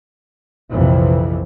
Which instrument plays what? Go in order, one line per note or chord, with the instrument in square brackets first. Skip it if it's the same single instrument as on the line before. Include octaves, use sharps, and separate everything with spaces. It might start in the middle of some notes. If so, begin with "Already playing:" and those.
[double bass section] A#1 F2 C3 E3